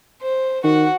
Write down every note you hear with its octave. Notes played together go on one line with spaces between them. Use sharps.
C5
D#3 F#4 F#5